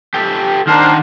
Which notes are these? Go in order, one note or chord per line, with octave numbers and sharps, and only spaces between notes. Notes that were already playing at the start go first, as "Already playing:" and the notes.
G4 A4
D#3 D4 A#4 C5 F#5